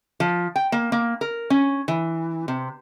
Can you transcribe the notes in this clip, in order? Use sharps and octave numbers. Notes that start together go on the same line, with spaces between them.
F3
G5
A#3
A#3
A#4
C#4
E3
C3